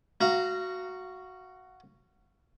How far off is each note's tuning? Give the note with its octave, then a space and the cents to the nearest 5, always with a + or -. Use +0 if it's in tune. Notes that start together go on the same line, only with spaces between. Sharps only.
F#4 +0 F5 -25 A#5 +0